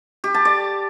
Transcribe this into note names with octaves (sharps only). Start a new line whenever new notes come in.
G4
A5
D5